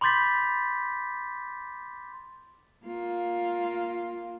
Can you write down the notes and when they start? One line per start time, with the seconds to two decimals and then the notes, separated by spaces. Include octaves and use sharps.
0.01 B5 C6 D6 G6 A6 B6
2.86 A#3 F4